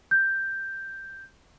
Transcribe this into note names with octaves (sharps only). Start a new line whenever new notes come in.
G6